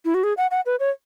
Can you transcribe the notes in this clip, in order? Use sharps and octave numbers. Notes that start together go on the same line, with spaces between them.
E4
F#4
G#4
F#5
F#5
B4
C#5